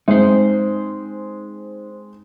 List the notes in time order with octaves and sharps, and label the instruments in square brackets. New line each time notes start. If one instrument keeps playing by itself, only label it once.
[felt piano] G#3 C4 [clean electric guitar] D#4 C5